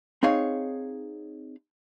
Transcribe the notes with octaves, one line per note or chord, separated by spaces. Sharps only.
C4 D#4 G#4 C#5 F5